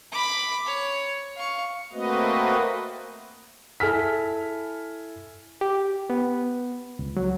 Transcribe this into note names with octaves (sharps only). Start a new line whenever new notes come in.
B5 D6
C#5
F5 C#6
A3 A#3 C4 F#4 B4 D#5
E4 A4 G#5 F6 B6
G4
B3
C#2
F#3